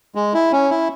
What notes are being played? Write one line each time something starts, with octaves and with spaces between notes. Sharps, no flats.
G#3
E4
C#4
E4